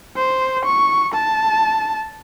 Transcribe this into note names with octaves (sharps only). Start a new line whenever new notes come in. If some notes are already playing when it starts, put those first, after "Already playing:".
C5
C#6
A5